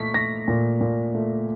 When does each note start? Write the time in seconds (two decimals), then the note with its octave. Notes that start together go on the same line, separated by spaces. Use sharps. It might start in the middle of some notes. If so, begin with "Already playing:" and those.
Already playing: A#2 A3 C#6 B6
0.14 A3 A#6
0.48 A#2
0.81 A#2
1.14 A3